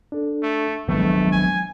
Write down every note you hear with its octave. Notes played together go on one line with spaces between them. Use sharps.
D4 A4
A3
D#3 F3 F#3 G#3 A3 B3 D4
G#5